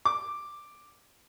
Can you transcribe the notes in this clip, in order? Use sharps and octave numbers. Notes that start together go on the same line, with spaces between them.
D6